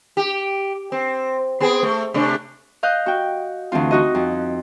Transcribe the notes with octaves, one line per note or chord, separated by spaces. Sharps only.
G4
C4
B3 C4 G#4
A3
C3 A3 D4
D#5 F5 F#6 G6
F#4 G5
D2 E3 C4 F4
D#4 F#4 D#5
F2